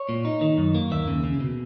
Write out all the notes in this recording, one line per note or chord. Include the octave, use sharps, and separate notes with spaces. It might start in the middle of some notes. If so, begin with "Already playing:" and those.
Already playing: C#5
A#2
D#4
D#3
F#2
A#3
D#2 E5
C#3
C#3
B2